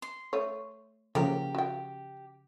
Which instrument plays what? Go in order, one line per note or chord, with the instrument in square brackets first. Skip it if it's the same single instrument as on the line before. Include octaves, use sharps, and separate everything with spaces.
[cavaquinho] C6
[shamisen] A3 C#5
[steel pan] C#3 F3 [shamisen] A#3 F#4 A#4 [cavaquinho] G4
[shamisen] F#4 G5